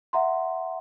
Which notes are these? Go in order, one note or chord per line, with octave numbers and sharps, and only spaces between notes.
E5 F#5 A#5 C6